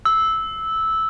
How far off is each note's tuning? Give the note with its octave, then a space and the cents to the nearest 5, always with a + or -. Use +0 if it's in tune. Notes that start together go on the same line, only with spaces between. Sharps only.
E6 -10